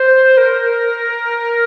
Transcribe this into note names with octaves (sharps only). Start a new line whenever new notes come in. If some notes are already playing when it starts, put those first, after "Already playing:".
Already playing: C5
A#4